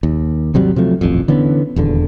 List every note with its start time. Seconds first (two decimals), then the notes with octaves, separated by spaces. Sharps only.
0.03 D#2
0.54 G#1 C3 F#3 G3
0.76 C3 F3 F#3 A3
1.01 D#1 A1 F2
1.28 D3 E3 B3 C#4
1.76 D#1 E2 D3